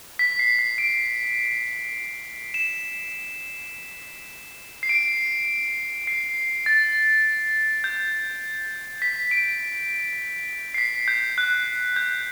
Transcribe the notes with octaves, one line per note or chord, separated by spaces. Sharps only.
B6
C7
C7
D7
E7
C7
D7
C7
A6
G6
B6
D7
C7
B6
G6
F#6
G6